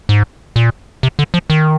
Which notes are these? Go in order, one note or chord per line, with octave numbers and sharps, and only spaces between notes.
G#2
A#2
C3
D3
F3
D#3